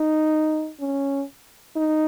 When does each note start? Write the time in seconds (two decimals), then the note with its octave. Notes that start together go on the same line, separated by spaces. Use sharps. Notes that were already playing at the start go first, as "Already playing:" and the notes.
Already playing: D#4
0.80 C#4
1.76 D#4